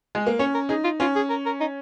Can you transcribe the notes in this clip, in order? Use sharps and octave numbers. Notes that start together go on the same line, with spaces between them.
G#3
A#3
C#4 C#5
A#4
D#4 G#4
F4
C#4 F4
G#4
A#4
A#4
D#4